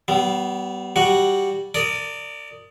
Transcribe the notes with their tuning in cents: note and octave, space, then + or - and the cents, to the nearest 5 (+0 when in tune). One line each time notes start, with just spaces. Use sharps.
G3 -35 B3 +0
G3 -5 F#4 +0 F#5 +0
A#4 -35 D5 +0 D#6 +0